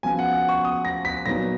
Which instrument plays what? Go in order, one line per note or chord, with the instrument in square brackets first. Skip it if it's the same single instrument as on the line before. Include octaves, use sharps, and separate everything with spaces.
[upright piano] C#3 F3 B3 F#4 [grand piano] G#5
[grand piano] F#5
F#5
C#6
D#6
A#6
B6
[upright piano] A#2 F#3 B3 D#4 [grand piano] A#6